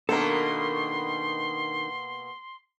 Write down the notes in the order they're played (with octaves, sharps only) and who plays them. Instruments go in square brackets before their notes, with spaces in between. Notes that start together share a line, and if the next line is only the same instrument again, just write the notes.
[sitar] B2 A#3 B3 [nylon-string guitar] D#3 D4 [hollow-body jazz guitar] A4 A#4 [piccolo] C6